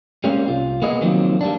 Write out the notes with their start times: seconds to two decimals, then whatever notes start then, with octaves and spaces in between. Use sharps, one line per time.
0.24 G3 G#3 A#3 C4 C#4
0.48 C2 F4
0.82 A#3 B3 G#4 D#5
1.01 D#3 F3 F#3 A#3 C4
1.41 G3 A#3 D4